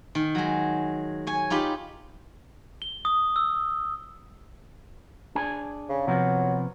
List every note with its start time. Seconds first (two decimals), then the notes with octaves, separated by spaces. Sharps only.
0.15 D#3
0.35 F#3 G#3
1.27 C#5 G#5
1.50 D#4 F4 G4 B5
2.82 G7
3.05 D#6
3.36 E6
5.35 D4 G#4 G#5
5.89 C#3
6.07 C3 F3 F#3 B3